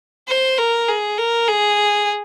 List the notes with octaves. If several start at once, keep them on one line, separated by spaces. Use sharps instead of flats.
C5
A#4
G#4
A#4
G#4